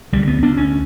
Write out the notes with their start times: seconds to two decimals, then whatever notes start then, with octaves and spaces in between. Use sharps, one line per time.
0.13 D2 G3
0.27 B3
0.42 D2 D4
0.57 C#4